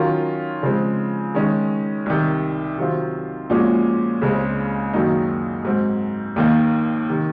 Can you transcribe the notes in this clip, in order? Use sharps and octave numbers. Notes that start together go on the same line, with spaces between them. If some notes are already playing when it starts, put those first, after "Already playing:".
Already playing: D#3 F#3 C#4 F4 A#4
C#3 F3 G#3 C4
D#3 G#3 C#4
C2 C3 D#3
C3 D#3 F#3 C4 F4
A#2 F3 G#3 C#4 F#4
C#2 C#3 G#3 C4
F#2 D#3 F#3 A#3 D#4
G#2 F#3 C4
D#2 D#3 A#3
C3 D#3